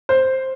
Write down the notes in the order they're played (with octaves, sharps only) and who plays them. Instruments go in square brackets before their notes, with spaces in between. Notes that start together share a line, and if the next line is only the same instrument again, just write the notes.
[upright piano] C5